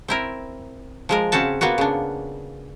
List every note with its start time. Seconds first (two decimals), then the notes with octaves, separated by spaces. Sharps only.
0.08 C4 E4 A#4
1.09 F3 G#3 A#4
1.32 C#3 C4 C#4 F#4 A5
1.61 A#3 B3 F4 F#4
1.78 C#3 D4